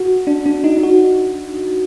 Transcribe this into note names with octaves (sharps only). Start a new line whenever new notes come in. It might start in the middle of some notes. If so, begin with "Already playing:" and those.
Already playing: F#4
D4
D4
D#4
D#4
F#4